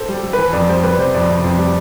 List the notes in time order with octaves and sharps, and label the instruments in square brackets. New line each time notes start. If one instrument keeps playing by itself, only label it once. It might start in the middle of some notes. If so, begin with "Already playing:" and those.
Already playing: [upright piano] A4 C5
[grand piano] G3
G3
[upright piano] B4
[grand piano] E3
[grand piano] F2 [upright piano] D5
[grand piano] G3 [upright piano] C5
[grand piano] G3 [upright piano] B4
[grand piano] C3 [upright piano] C5
[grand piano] F2 [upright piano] D5
[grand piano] C3
F2
G3